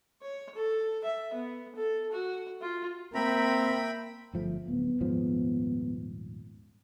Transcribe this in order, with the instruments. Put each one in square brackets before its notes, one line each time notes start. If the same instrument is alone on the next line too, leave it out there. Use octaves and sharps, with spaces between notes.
[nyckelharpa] C#5
A4
E5
B3
A4
F#4
F4
[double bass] A#3 [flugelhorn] C4 [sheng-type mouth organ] E5 G5 B5 [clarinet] A#5
[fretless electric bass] G1 F3 A3
[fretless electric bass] D1 [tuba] B3
[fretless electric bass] D#1 G#2 F3